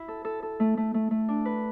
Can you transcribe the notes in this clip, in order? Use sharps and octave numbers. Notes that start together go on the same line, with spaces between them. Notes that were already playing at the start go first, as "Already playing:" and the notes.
Already playing: E4
A4
A4
A4
A3
A3
A3
A3
D4
B4